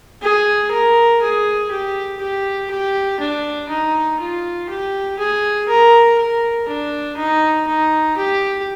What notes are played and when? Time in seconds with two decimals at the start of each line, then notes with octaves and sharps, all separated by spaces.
0.22 G#4
0.71 A#4
1.21 G#4
1.71 G4
2.20 G4
2.70 G4
3.20 D4
3.69 D#4
4.19 F4
4.69 G4
5.18 G#4
5.68 A#4
6.18 A#4
6.68 D4
7.17 D#4
7.67 D#4
8.17 G4